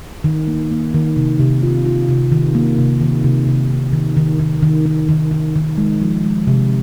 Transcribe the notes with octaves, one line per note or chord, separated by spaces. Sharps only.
D#3
A#3
A#3
D#3
C3
C3
F4
F4
C3
D#3
A#3
C3
D#3
C3
C3
C3
D#3
D#3
D#3
D#3
D#3
D#3
D#3
D#3
G#3
F3
G#3
C3